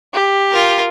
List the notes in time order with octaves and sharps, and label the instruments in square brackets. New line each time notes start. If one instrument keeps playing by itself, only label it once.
[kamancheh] G4
[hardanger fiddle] F4 A#4